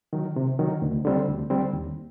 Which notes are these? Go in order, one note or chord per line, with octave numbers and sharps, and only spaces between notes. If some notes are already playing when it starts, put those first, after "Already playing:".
D#3 F#3
C3
D#3 F#3
D2
D3 G3 C4
D2
D3 G3 C4
D#2